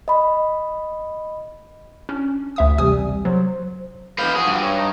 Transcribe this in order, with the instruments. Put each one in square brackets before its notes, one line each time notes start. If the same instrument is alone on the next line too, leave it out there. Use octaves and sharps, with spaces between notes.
[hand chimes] D#5 B5
[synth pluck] C#4 D4
D2 E5 D#6
[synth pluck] A1 G#5 D#6 [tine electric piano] C3 G3
[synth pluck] F#3 [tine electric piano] C5
[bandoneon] E2 G#3 G6 [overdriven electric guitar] B4 F5
[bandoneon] F3 F#4 [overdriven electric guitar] G#4
[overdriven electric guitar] G2
[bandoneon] C#5
D#4